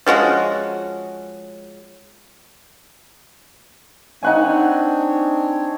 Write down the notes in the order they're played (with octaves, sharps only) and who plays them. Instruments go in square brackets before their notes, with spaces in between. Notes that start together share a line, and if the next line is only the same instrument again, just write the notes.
[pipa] F3 G#3 C#4 F#4
[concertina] C4 D4 C#5 [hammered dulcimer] D#4 F#5 G#5